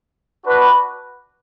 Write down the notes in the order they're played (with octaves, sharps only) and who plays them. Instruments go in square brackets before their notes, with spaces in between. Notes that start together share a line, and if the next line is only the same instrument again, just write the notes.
[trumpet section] D4 F#4 B4